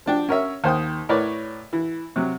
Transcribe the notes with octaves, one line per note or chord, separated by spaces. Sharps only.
F3 D4 G5
C#4 A#4 C#5 E5
D#2 C5 G5 D#6
A2 A#4 B4 C#5 D5
E3
C3 F#3